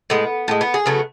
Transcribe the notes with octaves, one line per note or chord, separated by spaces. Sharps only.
A2 G#3 B3
A2 G#3
B3
G#4
C#3 F#3 A3 B3